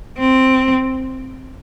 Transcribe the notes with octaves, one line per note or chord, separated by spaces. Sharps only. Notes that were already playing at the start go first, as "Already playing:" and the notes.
C4